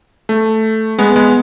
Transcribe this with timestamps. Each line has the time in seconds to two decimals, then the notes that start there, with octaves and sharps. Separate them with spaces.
0.29 A3
0.98 G#3 B3
1.16 G#3 B3